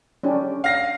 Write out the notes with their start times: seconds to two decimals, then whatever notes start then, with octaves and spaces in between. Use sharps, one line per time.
0.23 C#4 D4 G4
0.64 F5 A#6 C7